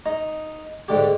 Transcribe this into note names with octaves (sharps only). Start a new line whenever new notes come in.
D#4 D#5
G#2 D3 G4